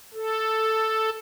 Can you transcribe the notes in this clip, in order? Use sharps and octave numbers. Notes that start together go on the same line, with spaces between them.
A4